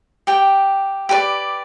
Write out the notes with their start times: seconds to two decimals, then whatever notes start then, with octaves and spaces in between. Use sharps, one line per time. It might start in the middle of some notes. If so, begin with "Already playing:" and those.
0.27 G4 G5
1.09 G4 B4 D5